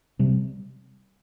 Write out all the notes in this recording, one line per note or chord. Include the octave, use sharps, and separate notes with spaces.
C3 G3 C4